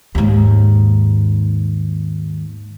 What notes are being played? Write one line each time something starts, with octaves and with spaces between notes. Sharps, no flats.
D#2 G#2